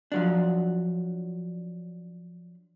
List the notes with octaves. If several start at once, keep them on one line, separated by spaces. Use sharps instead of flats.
F3 F#3 D4